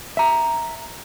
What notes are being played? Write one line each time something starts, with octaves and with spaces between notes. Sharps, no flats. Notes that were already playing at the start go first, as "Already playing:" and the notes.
E5 A#5